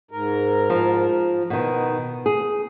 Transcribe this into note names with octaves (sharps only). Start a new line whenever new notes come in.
G#2 A#4
F3
B2 D#3 B3
G#4